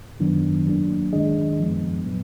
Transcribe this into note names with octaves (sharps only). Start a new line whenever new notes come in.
F#2 D#3 F#3 B3 D4
F#3 A#3 D4
D#3 G#3 D4 G#4 D#5
F#2 F3 G#3 B3
A#2 F#3 B3